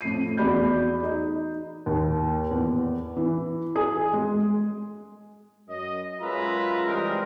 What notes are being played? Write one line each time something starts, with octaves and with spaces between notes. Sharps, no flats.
F2 A2 C7 D#7
E2 F#4 D5 B5 G6
D#4
D#2
E2
E3
G#4
G#3
F#2 D#5
F#2 G#3 F4 B4 E5 A#5
E3 G3 G#3 C4 A#4